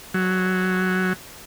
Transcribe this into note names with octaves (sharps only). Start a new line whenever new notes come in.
F#3